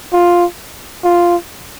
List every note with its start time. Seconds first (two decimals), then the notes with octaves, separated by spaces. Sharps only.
0.13 F4
1.04 F4